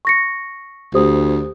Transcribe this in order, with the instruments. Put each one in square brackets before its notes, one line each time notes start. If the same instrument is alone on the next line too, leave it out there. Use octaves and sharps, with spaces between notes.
[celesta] C#6 A#6 C#7
[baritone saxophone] D2 [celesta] G4 C5 D#6